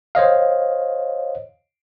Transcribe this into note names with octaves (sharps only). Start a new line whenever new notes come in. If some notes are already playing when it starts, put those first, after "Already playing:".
C5 C#5 D#5 F5